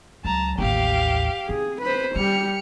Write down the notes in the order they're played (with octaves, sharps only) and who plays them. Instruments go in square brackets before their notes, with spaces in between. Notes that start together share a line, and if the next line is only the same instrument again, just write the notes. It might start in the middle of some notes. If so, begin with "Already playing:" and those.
[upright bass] C#2 F#3 [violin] A5 A#5
[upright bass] A1 D#2 [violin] G4 F5
[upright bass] C4 [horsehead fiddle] G#4
[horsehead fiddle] B4 C5 [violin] B5
[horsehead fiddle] G3 G4 [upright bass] C#4 [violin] F6 C#7